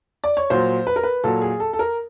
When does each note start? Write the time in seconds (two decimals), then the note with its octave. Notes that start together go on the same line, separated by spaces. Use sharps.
0.24 D5
0.37 C#5
0.50 A#2 F#3 C5
0.87 B4
0.96 A#4
1.03 B4
1.24 A#2 F#3 A4
1.42 G#4
1.60 A4
1.73 A4
1.79 A#4